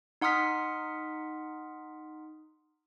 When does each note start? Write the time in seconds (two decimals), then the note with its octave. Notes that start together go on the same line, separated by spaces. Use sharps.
0.21 D#4 F#5 C6 D#6 F6 B6